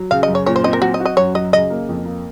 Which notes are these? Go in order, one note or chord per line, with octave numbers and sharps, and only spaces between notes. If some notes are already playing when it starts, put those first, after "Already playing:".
Already playing: F#3
C#3 F5
D#5
F#2
C#5
A#2 C#5
C5
C4 D#5
A#4
F#3 F#4
D#5
F#4
D#5
F#2 C#5
F#3 D#5
C#3 D#5
A#3
F2
A#3